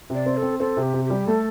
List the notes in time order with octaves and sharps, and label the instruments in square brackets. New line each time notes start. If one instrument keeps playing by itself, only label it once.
[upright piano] C3 [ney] D5
[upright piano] C4
[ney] A4
[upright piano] C4
[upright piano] C4 [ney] A4
[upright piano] C3
[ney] G4
[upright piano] C3
[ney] G4
[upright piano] G3
[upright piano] A3 [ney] A4